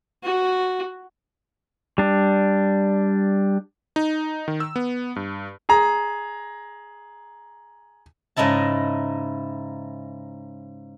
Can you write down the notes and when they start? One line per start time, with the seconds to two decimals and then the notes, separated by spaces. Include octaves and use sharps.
0.23 F#4
1.98 G3 D4
3.96 D#4
4.48 D#3
4.60 E6
4.76 B3
5.16 G2
5.69 G#4 A#5
8.37 G#2 C#3 D#4 E4 A5